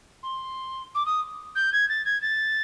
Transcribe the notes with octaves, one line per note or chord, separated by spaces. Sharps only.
C6
D6
D#6
G6
G#6
A6
G#6
A6